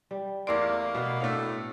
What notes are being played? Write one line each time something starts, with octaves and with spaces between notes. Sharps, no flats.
G3
E2 A3 A#3 D5 C6 D6
B2 B3
A2 A3 D4 F5